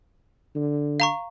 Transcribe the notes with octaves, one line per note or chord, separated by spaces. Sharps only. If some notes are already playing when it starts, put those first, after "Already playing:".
D3
F5 A#5 C#6